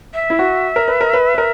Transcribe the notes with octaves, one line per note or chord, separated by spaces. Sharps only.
E5
E4
F#4
A#4
B4
A#4
B4
B4
A#4